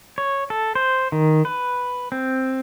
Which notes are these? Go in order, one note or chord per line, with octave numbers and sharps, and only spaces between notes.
C#5
A4
C5
D#3
B4
C4